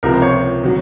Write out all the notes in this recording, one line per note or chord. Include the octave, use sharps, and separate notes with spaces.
C#2 C3 F3 A#4
C5
C#5
D#3 F#3